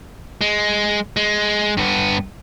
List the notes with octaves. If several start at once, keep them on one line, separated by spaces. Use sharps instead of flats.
G#3
G#3
G2 B3